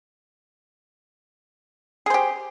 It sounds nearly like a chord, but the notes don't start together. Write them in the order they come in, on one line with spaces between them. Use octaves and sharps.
G#4 C5 G4